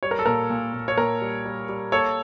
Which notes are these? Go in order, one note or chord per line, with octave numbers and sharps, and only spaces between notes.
G3 C#5
A#4
A4
A#2 A#4
A#2
A#2
C#5
A#2 A#4
G3
G3
G3
A#3 A4 C#5